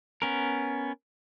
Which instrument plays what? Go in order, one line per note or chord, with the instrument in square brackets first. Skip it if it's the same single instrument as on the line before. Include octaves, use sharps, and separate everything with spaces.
[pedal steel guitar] B3 C#4 A#4